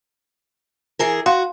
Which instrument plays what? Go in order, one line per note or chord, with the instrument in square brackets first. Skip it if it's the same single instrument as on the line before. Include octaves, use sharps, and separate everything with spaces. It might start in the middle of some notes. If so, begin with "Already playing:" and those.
[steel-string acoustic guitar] E3 G#4 A#4
[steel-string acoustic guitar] F#4 [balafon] F5 C6